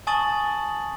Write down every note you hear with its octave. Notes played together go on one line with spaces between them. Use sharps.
G#5 A5 C#6 D#6 A6 F#7